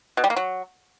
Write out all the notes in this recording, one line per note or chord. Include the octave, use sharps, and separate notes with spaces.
B2
G3
A#3
F#3